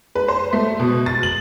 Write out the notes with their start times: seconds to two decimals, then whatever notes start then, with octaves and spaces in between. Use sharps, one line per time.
0.15 B4
0.28 C5
0.53 A3
0.80 B2
1.06 A6
1.23 F#7